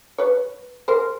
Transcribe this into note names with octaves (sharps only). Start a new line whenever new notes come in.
B4 C#5
A#4 C5